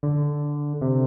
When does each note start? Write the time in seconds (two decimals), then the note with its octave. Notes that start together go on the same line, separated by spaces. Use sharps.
0.03 D3
0.81 C3